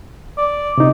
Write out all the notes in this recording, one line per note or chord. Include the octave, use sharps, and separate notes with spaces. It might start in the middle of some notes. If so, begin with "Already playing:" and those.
D5
C3 D#4